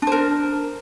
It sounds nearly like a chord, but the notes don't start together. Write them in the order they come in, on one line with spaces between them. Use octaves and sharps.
D4 C5 A#4